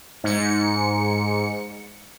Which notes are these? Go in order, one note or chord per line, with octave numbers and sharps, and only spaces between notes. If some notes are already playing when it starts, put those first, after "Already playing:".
G#2 C#7